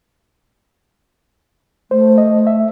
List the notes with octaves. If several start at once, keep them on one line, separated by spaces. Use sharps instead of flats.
A3 C5
D#5
E5